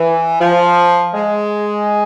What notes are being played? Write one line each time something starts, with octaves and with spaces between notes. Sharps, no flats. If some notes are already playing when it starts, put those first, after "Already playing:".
Already playing: E3
F3
G#3